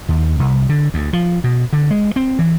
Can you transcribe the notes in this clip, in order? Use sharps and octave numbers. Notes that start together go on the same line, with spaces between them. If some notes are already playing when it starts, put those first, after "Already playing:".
D#2
C2
D3
D2
F3
B2
D3
G#3
C4
E3